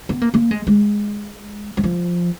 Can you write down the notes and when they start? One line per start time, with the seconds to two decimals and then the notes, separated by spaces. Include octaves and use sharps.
0.09 B3
0.22 A#3
0.34 A#3
0.51 G#3
0.67 G#3
1.77 F#3
1.84 F3